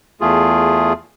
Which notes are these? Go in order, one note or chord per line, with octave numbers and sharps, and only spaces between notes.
E2 A3 F4 G#4